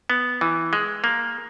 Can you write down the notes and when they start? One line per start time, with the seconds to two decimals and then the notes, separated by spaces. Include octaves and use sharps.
0.10 B3
0.41 E3
0.73 G#3
1.04 A#3